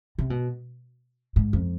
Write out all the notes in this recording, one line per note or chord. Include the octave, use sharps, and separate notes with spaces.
C3
B2
G#2
F2